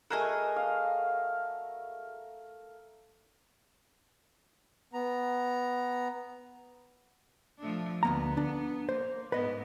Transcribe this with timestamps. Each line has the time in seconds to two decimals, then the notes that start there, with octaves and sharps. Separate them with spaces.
0.10 A3 F#4 G#4 A#4 D#5
0.56 F5
4.93 B3 A#5
7.58 F3 A3 D4
8.03 D2 A#3 B3 A#5
8.37 D4
8.89 A#3 C5
9.32 G#2 B3 B4 D#5